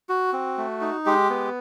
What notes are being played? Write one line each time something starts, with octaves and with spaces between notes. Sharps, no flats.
F#4
C4
A3
D#4
G#3 G4
B3